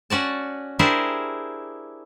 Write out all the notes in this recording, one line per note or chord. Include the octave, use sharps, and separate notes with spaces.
C#4 F#4 D5 A5
D4 E4 G4 G#4 A#4 C5